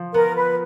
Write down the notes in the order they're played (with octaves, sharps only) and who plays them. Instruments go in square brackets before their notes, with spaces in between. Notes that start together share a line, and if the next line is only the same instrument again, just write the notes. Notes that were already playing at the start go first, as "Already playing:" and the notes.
Already playing: [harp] F3
[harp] B3 [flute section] A#4
[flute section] B4